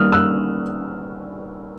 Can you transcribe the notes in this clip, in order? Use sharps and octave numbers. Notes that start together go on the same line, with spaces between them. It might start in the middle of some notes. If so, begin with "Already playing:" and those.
Already playing: D#3 G3 A#3 D#6 F6
E6 F#6